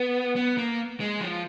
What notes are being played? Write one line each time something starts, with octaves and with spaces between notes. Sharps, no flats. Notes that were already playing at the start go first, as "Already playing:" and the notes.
Already playing: B3
B3
A#3
G#3
F3